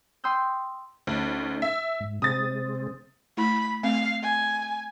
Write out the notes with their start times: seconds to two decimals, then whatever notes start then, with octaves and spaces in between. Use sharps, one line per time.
0.24 G5 C6 D#6 E6 G6
1.07 D2 A3 C#4 D#4
1.62 E5
2.00 G#2
2.22 C3 G#3 C4 D#6 A6
3.37 A3 E4 B5
3.83 A3 C4 F5
4.22 G#5